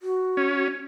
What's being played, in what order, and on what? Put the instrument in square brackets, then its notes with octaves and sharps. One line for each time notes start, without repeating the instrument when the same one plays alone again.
[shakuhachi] F#4
[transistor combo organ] C#4